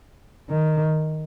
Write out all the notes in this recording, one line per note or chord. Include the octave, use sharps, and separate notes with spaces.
D#3